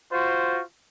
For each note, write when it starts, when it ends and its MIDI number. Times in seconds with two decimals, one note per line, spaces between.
0.12 0.61 65
0.12 0.61 66
0.12 0.61 72